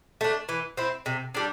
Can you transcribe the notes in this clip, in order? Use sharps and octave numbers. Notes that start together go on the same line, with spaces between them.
A3 D4
E3
C4 E4
C3
G3 D4